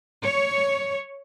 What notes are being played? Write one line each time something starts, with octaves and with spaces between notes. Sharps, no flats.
C#5